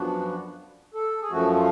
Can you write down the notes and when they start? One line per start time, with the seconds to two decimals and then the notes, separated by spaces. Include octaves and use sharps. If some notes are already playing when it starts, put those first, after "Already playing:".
Already playing: F#2 F3 B3 D4 F#4
0.94 A4
1.22 G#4
1.31 F#2 F3 A3 F#4
1.55 F4